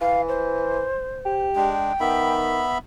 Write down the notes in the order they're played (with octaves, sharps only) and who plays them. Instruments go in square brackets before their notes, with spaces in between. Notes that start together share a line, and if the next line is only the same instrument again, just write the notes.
[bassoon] E3 [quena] F5
[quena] C5
[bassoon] G4
[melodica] G#3 D4 [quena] G5
[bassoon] D#3 [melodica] B3 E5 B5